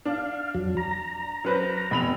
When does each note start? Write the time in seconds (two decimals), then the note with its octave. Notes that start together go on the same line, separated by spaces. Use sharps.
0.05 D4 F5
0.55 F2 F#3
0.77 A#5
1.44 F#2 B4 C5
1.91 F1 B2 B5 F7